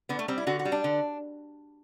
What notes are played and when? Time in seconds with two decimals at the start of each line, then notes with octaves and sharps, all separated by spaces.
0.09 D3 B3
0.19 A3
0.28 G3 C4
0.38 E4
0.47 D3 F#4
0.59 F#4
0.65 G3
0.72 D4
0.84 D3